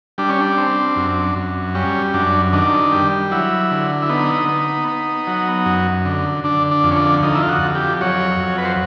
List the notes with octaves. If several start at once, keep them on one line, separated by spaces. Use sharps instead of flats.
G3 D4
C#4
D4
C4
F#2
F#2
G3 C#4
F#2 D4
D#3 D4
G3
F#3 E4
D3
E4
B3 D#4
B3
B3
F#3
F#2
D3
D3 D4
D4
F2
C#4
D4
F2 D#4
E4
F4
F#4
F2
G4
F#3 C#5
F2
B4
C5